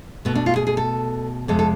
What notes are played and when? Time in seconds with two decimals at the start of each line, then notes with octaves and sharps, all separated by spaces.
0.25 B2 A3 B3
0.35 D4
0.46 F4
0.56 G#4
0.67 G#4
0.77 A4
1.48 F2 C3 G#3 A4
1.59 A4